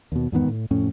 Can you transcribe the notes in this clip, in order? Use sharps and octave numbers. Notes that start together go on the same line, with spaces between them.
D#2 B2
E2 G#2 D#3 B3
A2
F2 A2 C#4